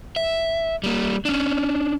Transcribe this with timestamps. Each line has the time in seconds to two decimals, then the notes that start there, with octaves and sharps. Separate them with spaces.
0.16 E5
0.83 G3 A#3
1.25 C#4 D4